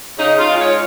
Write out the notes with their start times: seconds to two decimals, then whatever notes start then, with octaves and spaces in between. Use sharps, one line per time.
0.18 C#3 D#4
0.38 F4
0.49 G#3 C#4
0.58 C#5